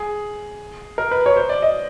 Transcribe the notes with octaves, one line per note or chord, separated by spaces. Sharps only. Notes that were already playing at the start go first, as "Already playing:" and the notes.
Already playing: G#4
A#4
B4
C#5
C5
D5
D#5